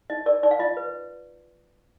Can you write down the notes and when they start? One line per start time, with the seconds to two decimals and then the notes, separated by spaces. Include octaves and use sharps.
0.10 D#4 D#5
0.26 A#4 D5
0.43 D#4 D5
0.51 F5
0.59 F4 D#5
0.77 B4